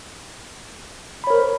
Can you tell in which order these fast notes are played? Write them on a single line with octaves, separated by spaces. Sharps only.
B5 C#5 A#4 C5